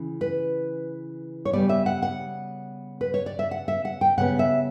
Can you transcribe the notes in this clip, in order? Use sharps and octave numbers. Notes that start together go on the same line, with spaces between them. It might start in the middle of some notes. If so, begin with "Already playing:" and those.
Already playing: C#3 E3
B4
C#5
C#3 G3 B3 D5
E5
F#5
F#5
B4
C#5
D5
E5
F#5
E5
F#5
G5
C#3 G3 B3 F#5
E5